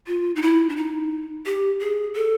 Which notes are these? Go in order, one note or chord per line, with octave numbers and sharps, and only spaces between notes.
F4
D#4
E4
D4
D#4
G4
G#4
A4